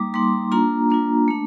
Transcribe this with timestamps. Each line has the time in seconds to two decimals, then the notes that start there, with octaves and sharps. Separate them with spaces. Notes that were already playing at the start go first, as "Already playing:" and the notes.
Already playing: G3 A#3 D#4 D6
0.14 G3 A#3 D#4 C6
0.52 A#3 D4 F4 A#5
0.90 A#3 D4 F4
1.28 A3 D4